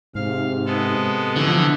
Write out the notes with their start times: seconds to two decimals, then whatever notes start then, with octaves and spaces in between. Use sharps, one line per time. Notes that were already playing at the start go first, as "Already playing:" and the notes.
0.15 G#2 C3 F5
0.66 G#3 B3 A4
1.36 B2 D3 E3 F3